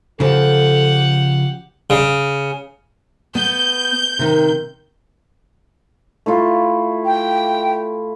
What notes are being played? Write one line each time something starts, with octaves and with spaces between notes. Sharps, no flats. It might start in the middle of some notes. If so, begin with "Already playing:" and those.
C#3 F3 G4 A4 F#5
C#3
B3 G6
C3 D#3
A3 E4 F4
G5